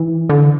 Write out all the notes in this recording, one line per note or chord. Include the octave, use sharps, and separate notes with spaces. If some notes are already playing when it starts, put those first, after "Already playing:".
Already playing: E3
D3